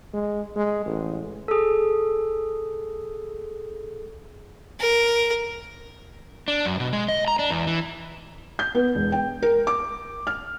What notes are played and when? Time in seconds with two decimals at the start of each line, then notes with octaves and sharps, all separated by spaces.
0.14 G#3
0.56 G#3
0.85 A1
1.48 G#4 A4
4.80 A#4
6.48 D4
6.66 F#2
6.80 B2
6.93 G#3
7.08 D#5
7.28 A#5
7.39 D4
7.50 E2
7.67 E3
8.59 G6
8.75 B3
8.95 E1
9.12 G5
9.42 A#4
9.67 D6
10.27 F6